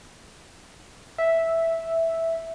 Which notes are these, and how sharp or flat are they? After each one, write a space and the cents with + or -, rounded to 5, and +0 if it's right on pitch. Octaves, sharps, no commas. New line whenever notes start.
E5 -5